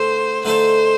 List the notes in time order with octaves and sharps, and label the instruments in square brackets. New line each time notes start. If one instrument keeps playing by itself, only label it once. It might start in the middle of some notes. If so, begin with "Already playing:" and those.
Already playing: [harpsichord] D3 A3 A4 [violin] C5
[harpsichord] D3 A3 D#4 A4 [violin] C5